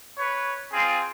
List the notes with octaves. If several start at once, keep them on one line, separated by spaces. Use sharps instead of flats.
B4 C#5
C4 F4 G#4